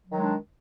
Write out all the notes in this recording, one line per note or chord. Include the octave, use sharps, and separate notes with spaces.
D#3 F#3 G#3 D4